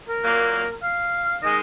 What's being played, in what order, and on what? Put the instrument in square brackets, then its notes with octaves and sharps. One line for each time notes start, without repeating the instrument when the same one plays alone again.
[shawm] A#4
[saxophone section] A#2 F#3 A#3
[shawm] F5
[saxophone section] D#3 G#3 [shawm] D#5